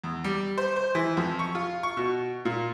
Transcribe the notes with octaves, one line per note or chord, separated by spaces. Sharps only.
E2
G3
C5
C5
E3
F2
C#6
F4
C#6
B2
A#2